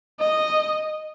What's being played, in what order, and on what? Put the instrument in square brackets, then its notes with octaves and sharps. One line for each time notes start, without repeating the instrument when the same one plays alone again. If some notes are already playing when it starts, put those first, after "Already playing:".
[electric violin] D#5